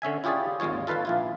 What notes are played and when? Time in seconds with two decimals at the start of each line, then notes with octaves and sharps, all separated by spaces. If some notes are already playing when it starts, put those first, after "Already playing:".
0.02 D3 C#4 E5 G#5
0.24 E4 F4 G4 G#4 C#5 D5
0.60 G#1 D#2 G#3 F4 C#5
0.87 F4 A4 B4 F5 A5
1.05 A#1 E4 F4